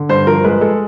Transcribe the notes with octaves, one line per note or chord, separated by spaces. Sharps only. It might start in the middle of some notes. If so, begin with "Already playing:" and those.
Already playing: D3
G2 C5
F3 A#4
G#3 B4
G#3 A4